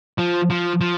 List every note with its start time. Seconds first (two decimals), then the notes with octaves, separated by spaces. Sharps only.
0.18 F3
0.50 F3
0.81 F3